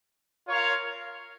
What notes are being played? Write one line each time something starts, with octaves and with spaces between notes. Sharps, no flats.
F4 A#4 C#5 F5